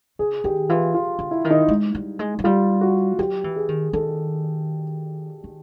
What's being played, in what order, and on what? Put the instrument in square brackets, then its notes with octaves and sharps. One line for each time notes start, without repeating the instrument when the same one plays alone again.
[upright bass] C#3 [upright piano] G#4
[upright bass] D#3 [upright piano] G4
[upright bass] E3 [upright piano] F4
[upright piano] F4
[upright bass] D3
[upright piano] E4
[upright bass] D#3
[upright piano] D#4
[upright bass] G#3
G3
G#3
F#3
[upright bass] G3 [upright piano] F4
[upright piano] F#4
[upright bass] F#3 [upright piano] G4
[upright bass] E3
[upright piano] G#4
[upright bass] D#3
[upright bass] D#3 [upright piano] A4
[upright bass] D#3